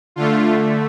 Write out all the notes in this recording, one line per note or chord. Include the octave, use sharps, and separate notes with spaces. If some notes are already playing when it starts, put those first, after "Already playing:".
D3 A3 F4